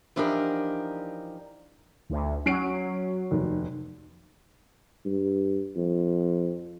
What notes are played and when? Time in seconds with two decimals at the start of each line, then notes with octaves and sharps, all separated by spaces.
0.16 E3 F3 D4 D#4 G4 A#4
2.10 D2
2.46 F#3 C#4 C7 D7
3.31 F1 D#2
5.05 G2
5.76 F2